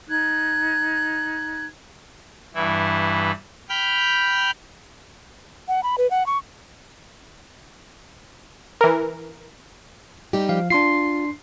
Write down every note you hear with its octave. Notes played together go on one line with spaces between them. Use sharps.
D#4 F#6 G#6
G2 E3 E4
G5 B5 F6 G6
F#5
B5
B4
F#5
C#6
E3 A#4
G3 D#4 G4
F3 F5
D4 F4 C6 C7